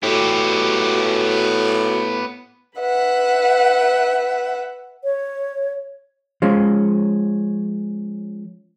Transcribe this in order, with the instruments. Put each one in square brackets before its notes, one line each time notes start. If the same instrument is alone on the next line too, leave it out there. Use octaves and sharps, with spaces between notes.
[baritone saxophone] A2 [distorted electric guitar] B3 G4 [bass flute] F#4
[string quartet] B4 E5 F#5
[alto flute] C#5
[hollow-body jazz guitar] F3 G#3 C#4